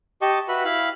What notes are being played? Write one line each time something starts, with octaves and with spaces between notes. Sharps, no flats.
G4 D#5 A5 C#6
F#4 B4 E5 B5
E4 F5 B5